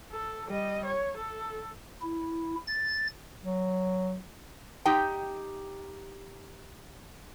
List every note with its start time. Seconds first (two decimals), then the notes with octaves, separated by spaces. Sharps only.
0.12 A4
0.47 G3 D#5
0.85 C#5
1.17 A4
2.01 E4
2.67 A6
3.43 F#3
4.85 D#4 G4 G5